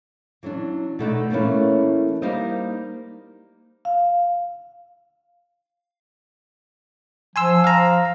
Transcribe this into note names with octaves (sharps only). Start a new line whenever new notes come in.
E3 F#3 C#4 D4
B2 A3 D#4 D5
E3 A3 A#3 C#4 E4
G3 A#3 D#4 C5 D#5
F5
F3 G#5 C6 E6
F5 A#5